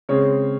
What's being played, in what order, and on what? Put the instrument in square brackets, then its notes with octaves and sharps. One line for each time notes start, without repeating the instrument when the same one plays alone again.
[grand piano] C#3 G#3 C4 C#5